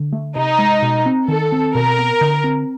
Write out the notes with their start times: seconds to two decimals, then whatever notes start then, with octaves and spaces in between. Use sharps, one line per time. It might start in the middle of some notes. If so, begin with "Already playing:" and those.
Already playing: D3
0.13 A3
0.36 C3 D#4
0.59 G#3
0.82 B2
1.06 C4
1.28 D#3 A4
1.52 C4
1.75 B2 A#4
1.98 B3
2.21 D3
2.44 C4